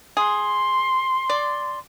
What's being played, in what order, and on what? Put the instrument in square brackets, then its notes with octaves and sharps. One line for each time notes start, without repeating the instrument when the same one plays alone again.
[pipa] G#4 [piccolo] C6
[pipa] D5